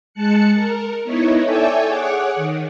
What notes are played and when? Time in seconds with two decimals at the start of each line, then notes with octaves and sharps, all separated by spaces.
0.14 G#3 A5 F#6 C#7
0.54 A#4
1.04 B3 D#4 E4 C#5
1.43 A4 C#5 D5 E5 G5 G#5
1.87 G#4 C#5 F#5 D6
2.36 D#3